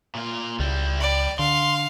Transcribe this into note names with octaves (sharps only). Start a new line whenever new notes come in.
A#2 F4
C#2 G3 E4
D5 G5 B5
D3 F5 C6